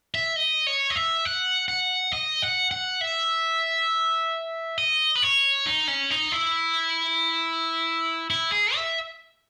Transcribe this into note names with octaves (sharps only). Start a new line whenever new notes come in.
E5
D#5
C#5
D#5
E5
F#5
F#5
D#5
F#5
F#5
E5
D#5
B4
C#5
D#4
C#4
D#4
E4
E4
G#4
E5